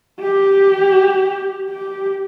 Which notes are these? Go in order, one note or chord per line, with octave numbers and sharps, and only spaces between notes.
G4
G4